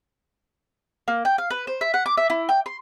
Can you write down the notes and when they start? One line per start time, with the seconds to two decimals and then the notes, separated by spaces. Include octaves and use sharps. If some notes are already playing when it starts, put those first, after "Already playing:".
1.08 A#3
1.25 G5
1.38 F5
1.50 B4
1.67 C5
1.81 E5
1.94 F#5
2.06 D6
2.17 E5
2.30 E4
2.49 G5
2.66 C6